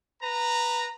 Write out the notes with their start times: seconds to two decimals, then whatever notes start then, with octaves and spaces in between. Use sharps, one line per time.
0.22 B4 A#5